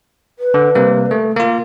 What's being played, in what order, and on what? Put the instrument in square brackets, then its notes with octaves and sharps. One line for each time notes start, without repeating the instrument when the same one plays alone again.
[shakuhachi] B4
[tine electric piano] D3
C3 G3 A#3
A3
A#3 F4